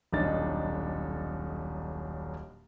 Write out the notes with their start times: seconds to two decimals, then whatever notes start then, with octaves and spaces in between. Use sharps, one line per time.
0.13 D#1 B1 D4 D#4 A6